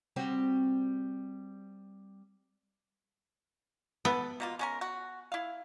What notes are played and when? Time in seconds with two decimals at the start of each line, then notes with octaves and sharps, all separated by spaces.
0.16 G3 C4 F#4
4.05 B3 A4
4.40 B2 A#3 F4
4.59 G#3 C#4 A#4
4.81 F#4
5.32 E4 F5